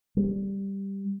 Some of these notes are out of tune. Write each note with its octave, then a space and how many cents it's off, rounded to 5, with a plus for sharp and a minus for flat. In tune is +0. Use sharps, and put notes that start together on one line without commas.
G3 +5